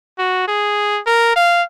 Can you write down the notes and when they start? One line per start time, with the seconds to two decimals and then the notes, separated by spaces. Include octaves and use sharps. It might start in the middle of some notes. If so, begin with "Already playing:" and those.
0.19 F#4
0.48 G#4
1.07 A#4
1.36 F5